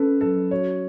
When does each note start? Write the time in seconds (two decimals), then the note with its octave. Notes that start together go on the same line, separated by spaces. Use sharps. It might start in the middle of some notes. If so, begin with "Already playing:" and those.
Already playing: C#4 A4 B4
0.21 F#3 A4
0.51 F#4 C#5